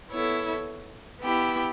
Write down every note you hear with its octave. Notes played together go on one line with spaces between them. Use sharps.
B3 E4 A4 C#5
B3 E4 G4